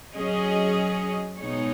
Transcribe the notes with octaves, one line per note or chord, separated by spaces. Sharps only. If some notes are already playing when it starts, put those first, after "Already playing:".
F#3 C#4 G#4 D#5
B2 G#3 D#4 G#4 C#5